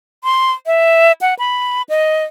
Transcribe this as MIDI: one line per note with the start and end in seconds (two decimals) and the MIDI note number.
0.24 0.52 84
0.66 1.12 76
1.21 1.34 78
1.39 1.82 83
1.89 2.25 75